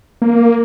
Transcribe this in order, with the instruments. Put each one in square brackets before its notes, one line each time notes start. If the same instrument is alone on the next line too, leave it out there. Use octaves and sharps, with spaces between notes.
[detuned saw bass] A#3